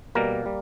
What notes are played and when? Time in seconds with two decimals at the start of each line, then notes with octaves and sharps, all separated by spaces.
0.15 B2 G3 A#3 A#4
0.46 G3